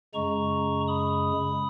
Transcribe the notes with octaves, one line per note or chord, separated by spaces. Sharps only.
F#2 C#3 G#3 A#5 C#6
B5 D#6